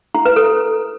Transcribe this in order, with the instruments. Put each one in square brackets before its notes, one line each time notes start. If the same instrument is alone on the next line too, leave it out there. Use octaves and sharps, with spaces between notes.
[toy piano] E4
B4
A4